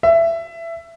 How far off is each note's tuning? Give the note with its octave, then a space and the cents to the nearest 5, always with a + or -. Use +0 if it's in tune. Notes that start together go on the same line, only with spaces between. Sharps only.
E5 +15